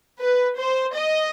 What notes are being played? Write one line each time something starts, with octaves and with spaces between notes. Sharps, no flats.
B4
C5
D#5